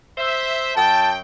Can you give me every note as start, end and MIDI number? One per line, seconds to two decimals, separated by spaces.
0.18 0.73 72
0.18 0.73 76
0.77 1.18 42
0.77 1.18 79
0.77 1.11 81